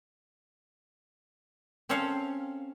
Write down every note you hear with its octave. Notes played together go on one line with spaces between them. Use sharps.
C4 C#4 A4 C#5 F5